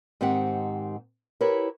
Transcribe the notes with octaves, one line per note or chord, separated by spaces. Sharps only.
G#2 D#3 C4 G4 F#5
E4 G4 A#4 B4 C#5